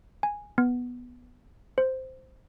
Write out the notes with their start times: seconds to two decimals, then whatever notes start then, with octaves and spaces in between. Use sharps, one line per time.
0.23 G#5
0.58 B3
1.78 C5